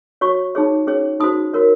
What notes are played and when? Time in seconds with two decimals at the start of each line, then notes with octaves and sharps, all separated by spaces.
0.21 F#4 C#5 C#6
0.55 D#4 G#4 C#5
0.87 C#4 G#4 C#5
1.20 D#4 F#4 C5 D#6
1.54 F#4 A#4 C#5